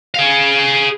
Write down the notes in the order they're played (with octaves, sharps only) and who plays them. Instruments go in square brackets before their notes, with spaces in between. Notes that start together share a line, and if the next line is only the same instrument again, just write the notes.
[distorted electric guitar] G#4 F5